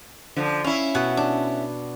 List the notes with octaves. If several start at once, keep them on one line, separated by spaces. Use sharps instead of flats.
D3 F3
C#4 E4 F5
B2 F#5
D4